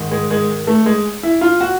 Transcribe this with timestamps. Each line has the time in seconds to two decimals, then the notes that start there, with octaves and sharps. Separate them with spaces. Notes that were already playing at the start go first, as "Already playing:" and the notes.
Already playing: G#2 D#3
0.11 G#3
0.30 G#3
0.67 A3
0.86 G#3
1.23 E4
1.41 F4
1.61 F#4